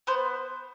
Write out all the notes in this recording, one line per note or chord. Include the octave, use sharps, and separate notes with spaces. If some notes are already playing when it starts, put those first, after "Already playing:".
B3 C5